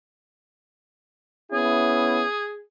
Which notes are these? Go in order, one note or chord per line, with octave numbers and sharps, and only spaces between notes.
B3 C#4 E4 G#4